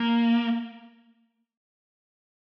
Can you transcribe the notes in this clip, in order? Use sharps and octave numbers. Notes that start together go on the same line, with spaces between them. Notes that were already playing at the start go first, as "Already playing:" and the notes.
Already playing: A#3